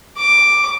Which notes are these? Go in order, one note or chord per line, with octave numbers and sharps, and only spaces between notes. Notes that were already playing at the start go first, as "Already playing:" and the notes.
D6